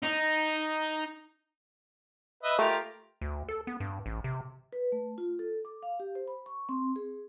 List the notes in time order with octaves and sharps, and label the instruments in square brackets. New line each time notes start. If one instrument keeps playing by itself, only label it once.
[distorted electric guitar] D#4
[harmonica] B4 D#5 E5
[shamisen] A3 [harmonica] F4 G4 A#4
[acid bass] D2
A4
B3
G2
A1
C3
[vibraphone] B4
A3
F4
A4
D6
F5
G4
C5
B5
C#6
C4
G#4